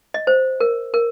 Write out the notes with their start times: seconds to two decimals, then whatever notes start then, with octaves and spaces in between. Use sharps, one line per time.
0.14 D#5
0.27 C5
0.60 A#4
0.94 A#4